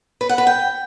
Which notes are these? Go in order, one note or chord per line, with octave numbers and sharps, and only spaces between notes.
B4
F#5
B4
G5